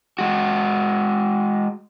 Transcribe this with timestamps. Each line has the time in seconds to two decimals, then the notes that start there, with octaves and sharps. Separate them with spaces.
0.19 G#3 F#4